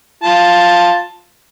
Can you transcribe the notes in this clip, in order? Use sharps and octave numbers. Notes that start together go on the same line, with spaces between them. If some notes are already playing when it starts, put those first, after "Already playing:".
F4 A5